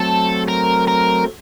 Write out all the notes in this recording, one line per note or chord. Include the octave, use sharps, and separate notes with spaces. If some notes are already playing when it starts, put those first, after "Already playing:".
Already playing: F#3 A3 C4 A4
A#4
A#4